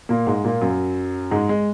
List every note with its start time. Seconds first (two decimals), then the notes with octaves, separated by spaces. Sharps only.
0.09 A#2 A#3
0.27 G#2 G#3
0.44 A#2 A#3
0.61 F#2 F#3
1.31 G#2 G#3
1.49 G#3